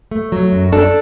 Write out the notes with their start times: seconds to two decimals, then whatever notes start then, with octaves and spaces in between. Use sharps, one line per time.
0.11 A3
0.32 F#3
0.52 F#2
0.72 D4 A4